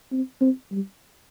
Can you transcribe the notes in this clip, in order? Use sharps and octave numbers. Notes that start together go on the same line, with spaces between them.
C4
C4
G3